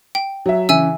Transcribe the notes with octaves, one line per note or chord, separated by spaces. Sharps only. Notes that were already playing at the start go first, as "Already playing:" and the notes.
G5
F#3 E5
C#3 E3 E5 G#5 E6